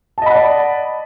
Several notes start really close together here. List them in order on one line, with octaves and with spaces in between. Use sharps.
A5 D#5 B5 F#5 D5